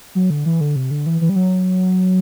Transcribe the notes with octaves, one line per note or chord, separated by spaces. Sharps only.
F#3
D3
E3
D3
C3
D3
E3
E3
G3
F#3